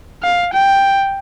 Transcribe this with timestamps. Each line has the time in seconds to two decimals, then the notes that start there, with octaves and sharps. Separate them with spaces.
0.23 F5
0.53 G5